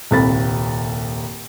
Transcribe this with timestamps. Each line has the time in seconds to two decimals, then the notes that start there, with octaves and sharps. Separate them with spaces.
0.11 D#1 C2 A4 B5 A6